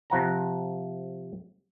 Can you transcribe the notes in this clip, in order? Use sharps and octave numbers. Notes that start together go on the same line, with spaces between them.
C3 F3 F#5 A#5